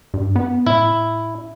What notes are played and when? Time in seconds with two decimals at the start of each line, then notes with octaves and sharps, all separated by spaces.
0.14 G2
0.36 B3
0.66 A2 E4